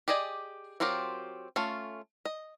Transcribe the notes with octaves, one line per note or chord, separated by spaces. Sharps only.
G4 G#4 D5 D#5 G#5
F#3 C4 F4 G4 A#4
A3 C#4 F4
D#5